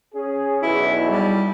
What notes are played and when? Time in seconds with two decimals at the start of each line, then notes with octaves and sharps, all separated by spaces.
0.14 C#4 G#4
0.62 B1 E2 E4
1.09 G3